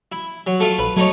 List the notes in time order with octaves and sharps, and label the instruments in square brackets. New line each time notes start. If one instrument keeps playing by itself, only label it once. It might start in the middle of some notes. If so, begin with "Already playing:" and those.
[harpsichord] E4
F#3
A3 F4 E5
[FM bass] A#1 [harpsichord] B4
[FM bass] F#3 [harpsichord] A3 D#4 C#5